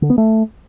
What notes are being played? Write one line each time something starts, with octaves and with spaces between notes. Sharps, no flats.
D3
B3
A3